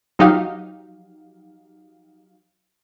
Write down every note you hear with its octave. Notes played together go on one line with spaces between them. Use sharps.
F3 F#3 D#4 F#4 G4 F5